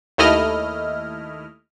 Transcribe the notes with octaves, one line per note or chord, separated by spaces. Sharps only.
D#2 A3 E4 D#5 F6